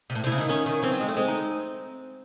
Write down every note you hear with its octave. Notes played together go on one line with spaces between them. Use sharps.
C3
A2
C3
E4
C#3
D#3 D#4
D#3 C#4
D#3
E3 C4
F#3
G#3
A3
G#3 C4
D#4